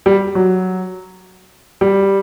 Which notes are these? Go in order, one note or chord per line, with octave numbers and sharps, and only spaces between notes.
G3
F#3
G3